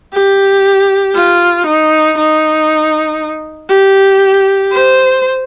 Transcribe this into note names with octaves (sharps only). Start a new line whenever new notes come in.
G4
F4
D#4
D#4
G4
C5